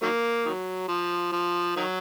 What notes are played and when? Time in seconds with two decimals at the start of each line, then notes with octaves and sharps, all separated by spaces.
0.02 D#3 F#3 A#3
0.45 D#3 F#3
0.88 F3
1.32 F3
1.76 D#3 F#3